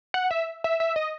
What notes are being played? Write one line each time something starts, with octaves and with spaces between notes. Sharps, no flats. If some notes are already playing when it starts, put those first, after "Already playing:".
F#5
E5
E5
E5
D#5